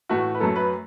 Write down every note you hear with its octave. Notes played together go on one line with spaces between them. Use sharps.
A2 E3 A3 F#4
B4
F#2 F#3 A3 A4
B4